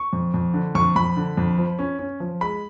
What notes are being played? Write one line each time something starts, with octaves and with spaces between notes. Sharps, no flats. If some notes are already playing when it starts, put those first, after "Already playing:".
Already playing: C#6
F2
F2
D3
F2 C#6
F2 B5
D3
F2
F3
C#4
C#4
F3
G#3 B5